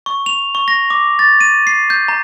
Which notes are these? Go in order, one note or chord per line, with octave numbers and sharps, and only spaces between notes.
C#6
F7
C#6
A#6
D6
A6
D#7
C7
G6
A#5